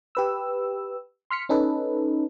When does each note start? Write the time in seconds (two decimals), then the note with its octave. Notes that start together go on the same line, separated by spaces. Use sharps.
0.15 G4 B4 E6
1.30 C6 F6 B6 C#7
1.49 C#4 D#4 A4 B4